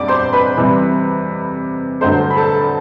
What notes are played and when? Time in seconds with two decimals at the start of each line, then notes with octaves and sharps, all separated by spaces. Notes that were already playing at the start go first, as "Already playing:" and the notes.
Already playing: E2 C3 G3 D4 D5 D6
0.08 C5 C6
0.33 B4 B5
0.57 C3 E3 G3
2.01 G2 D3 F#3 A3 C5 C6
2.31 B5
2.36 A4 A5